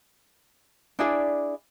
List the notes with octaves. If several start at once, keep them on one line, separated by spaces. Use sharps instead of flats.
D4 E4 G#4 D5